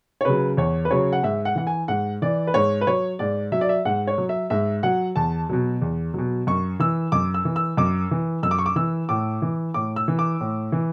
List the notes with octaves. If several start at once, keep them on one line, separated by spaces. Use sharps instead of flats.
C#5
C#3 F#3 B4
E2 C#5
B4
C#3 F#3 C#5
F#5
G#2 E5
F#5
E3 F#5
G#5
G#2 F#5
E3 D5
B4
G#2 C#5
B4
F#3 C#5
G#2 D5
F#3 E5
D5
E5
G#2 F#5
C#5
F#3
E5
G#2 E5
F#3 F#5
E2 A5
B2 F#3
E2
B2 F#3
F#2 C#6
E3 E6
F#2 D6
E6
E3
E6
F#2 D6
E3
F#2 E6
D6
C#6
D6
E3 E6
A2 D6
E3
A2 D6
E6
E3
D6
A2
E3